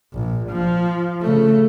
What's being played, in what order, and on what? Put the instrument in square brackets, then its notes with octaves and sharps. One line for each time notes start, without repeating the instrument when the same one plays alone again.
[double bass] A#1
F3
C#3 A3